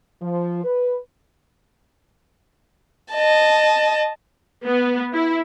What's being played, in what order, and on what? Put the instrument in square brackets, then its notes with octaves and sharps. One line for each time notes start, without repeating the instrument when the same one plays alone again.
[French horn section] F3
B4
[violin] D#5 A5
[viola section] B3
E4